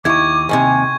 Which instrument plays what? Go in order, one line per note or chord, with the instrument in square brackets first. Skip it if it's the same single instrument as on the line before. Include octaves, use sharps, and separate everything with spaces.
[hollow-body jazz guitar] D#2 E4 [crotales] C#6 G#6 [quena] D6
[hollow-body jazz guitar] D#2 A2 C3 [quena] G#5